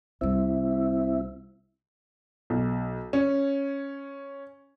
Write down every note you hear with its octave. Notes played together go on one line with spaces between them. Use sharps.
C2 G3 C4 E4 E5
B1
C#4